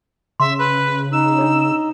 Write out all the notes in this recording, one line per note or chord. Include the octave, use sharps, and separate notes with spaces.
C#3 E5 C6
B4
D#4 E6
D4 C#5